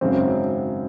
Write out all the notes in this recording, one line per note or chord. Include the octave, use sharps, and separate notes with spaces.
G#1 F#2 C#3 F#3 C4